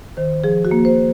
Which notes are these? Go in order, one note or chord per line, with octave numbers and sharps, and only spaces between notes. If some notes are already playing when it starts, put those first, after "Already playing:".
D#3 C5
F3 G#4
F#4
A#3
C5